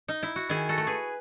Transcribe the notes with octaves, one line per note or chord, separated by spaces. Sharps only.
D#4
E4
F#4
D#3 E4 G#4
F#4 A4
A3
G#4 B4